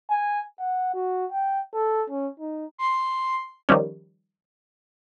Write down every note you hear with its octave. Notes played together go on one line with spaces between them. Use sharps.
G#5
F#5
F#4
G5
A4
C#4
D#4
C6
D#3 F3 G3 C#4